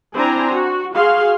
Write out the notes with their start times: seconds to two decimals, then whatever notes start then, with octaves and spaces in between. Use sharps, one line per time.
0.15 C4 D4 E4 C5 G#5 A#5
0.51 F#4
0.95 F#4 G#4 F5 C6